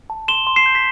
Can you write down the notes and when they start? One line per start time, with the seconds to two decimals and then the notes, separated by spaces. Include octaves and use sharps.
0.10 A5
0.28 C6 E7 G7
0.47 C6
0.56 C7 E7
0.66 G6
0.75 B6